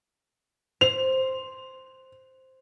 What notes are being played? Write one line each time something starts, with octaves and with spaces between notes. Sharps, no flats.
C5 F7